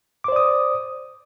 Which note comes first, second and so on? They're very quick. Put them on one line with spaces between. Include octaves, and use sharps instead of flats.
D6 C5 D5 D#6